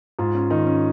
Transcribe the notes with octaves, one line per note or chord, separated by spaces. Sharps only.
G#2 F4
C#4
D#3 D#4
C#4